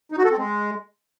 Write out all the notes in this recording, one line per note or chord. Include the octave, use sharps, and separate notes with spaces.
D#4
F#4
A4
C4
G#3